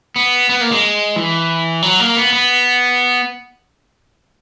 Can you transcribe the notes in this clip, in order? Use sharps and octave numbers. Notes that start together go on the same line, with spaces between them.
B3
B3
A#3
G#3
E3
F#3
A#3
B3
B3